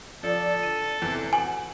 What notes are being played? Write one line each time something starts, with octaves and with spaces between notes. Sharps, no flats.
F3 A4 D5
D3 D5 D#7
E2 A2 C3 E3
F#4 G#5 F#7